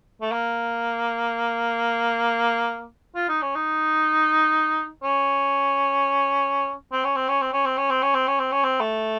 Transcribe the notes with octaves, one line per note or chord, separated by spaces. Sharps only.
A3
A#3
F4
D#4
C#4
D#4
C#4
C4
C#4
C4
C#4
C4
C#4
C4
C#4
C4
C#4
C4
C#4
C4
C#4
C4
A3